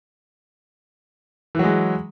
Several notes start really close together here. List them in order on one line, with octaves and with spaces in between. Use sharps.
E3 F#3 G#3